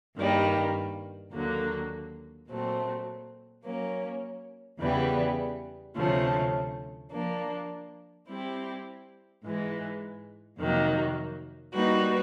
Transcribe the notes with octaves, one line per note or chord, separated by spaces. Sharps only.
G2 D#3 G3 A#3
D#2 D3 F#3 A#3
A#2 F#3 A3 C4
F#3 A#3 C#4
E2 C#3 E3 G3 B3
D2 C3 F3 A3 C#4
F3 A#3 D4
G3 C4 E4 G4
G#2 E3 G#3
F2 C3 D#3 F#3 A#3
G3 A#3 D#4 F#4 B4